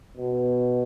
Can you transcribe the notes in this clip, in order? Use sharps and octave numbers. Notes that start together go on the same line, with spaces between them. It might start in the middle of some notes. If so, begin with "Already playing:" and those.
B2